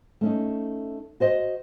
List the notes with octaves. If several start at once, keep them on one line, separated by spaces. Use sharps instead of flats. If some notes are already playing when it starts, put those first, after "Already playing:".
A3 C#4 D#4
F#4 C5 D#5